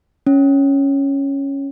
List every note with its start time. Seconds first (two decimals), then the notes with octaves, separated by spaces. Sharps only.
0.27 C#4